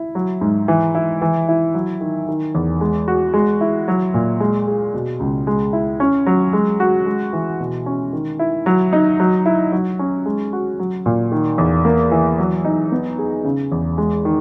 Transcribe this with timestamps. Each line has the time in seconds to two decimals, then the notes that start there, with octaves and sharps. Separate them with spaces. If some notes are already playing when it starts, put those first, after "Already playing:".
Already playing: E4
0.15 F#3
0.41 G#2
0.68 E3
0.95 E4
1.22 E3
1.49 E4
1.74 F#3
2.01 D#3
2.28 D#3
2.55 E2
2.81 G#3
3.08 F#4
3.34 G#3
3.61 E4
3.88 F#3
4.14 A#2
4.40 G#3
4.68 G#4
4.94 B2
5.20 C#2
5.47 G#3
5.73 E4
6.00 C#4
6.26 F#3
6.53 G#3
6.80 F#4
7.06 G#3
7.33 E3
7.60 B2
7.86 C#4
8.13 D#3
8.39 E4
8.66 F#3
8.93 D#4
9.20 F#3
9.46 E4
9.72 F#3
9.99 C#4
10.26 G#3
10.53 F#4
10.79 F#3
11.06 A#2
11.32 D#3
11.58 E2
11.85 A#3
12.12 E3
12.39 F#3
12.65 D#4
12.92 B3
13.19 G#4
13.44 C#3
13.72 E2
13.98 G#3
14.25 D#3